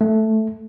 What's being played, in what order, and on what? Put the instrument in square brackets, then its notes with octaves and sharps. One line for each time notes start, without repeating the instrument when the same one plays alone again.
[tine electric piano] A3